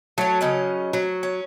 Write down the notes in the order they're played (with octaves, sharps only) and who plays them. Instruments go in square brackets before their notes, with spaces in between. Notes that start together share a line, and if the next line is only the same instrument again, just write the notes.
[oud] F#3 [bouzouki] A3 C#5
[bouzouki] C#3 C#4 D#5
[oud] F#3
[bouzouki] C#4